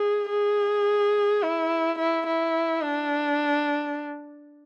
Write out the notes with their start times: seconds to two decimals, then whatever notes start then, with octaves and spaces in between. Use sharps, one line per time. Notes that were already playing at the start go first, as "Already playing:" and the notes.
Already playing: G#4
0.30 G#4
1.43 E4
1.99 E4
2.27 E4
2.83 D4